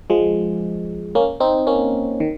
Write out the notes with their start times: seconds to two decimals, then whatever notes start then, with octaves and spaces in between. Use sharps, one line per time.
0.10 F3 G#3
1.15 A#3 C#4
1.40 C4 D#4
1.67 A#3 C#4
2.20 D#3